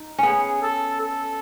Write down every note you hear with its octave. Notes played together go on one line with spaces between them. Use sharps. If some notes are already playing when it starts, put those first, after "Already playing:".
Already playing: D#4
B3 C#4 G#4
A4
A4